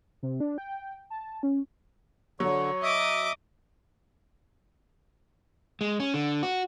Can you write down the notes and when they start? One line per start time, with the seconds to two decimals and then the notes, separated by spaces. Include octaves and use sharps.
0.23 C3
0.40 D4
0.58 G5
1.10 A5
1.43 C#4
2.40 D3 F#3 C#5
2.83 D#5 E5 D6 D#6
5.81 G#3
6.00 C#4
6.14 D3
6.43 F#4